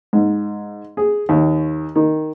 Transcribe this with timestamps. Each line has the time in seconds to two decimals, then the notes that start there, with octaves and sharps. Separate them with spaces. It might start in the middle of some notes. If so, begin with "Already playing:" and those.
0.13 G#2
0.97 G#4
1.29 D#2
1.96 D#3